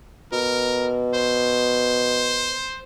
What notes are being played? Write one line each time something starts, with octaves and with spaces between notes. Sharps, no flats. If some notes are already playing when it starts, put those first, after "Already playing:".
B2 A#4
C5